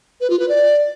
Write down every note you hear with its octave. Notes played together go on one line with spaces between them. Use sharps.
B4
F4
B4
D5